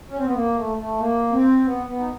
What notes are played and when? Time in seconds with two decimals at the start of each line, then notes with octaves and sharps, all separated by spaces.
0.09 C#4
0.18 C4
0.26 B3
0.34 A#3
0.56 A3
0.78 A3
0.99 A#3
1.32 C4
1.65 B3
1.87 B3
1.99 D#4